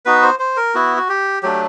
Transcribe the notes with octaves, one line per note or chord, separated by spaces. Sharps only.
B3 D#4 F#4 B4
C5
C5
A#4
B3 E4 F#4
F#4
G4
F#3 A3 D4 G4